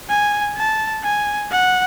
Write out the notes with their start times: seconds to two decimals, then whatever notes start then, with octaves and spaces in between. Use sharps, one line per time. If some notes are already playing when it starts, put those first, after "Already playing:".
0.09 G#5
0.56 A5
1.03 G#5
1.50 F#5